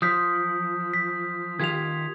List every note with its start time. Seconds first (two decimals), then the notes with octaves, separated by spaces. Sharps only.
0.02 F3 D#6 G6 B6
0.94 B6
1.59 D#3 F4 G4 G#6 F7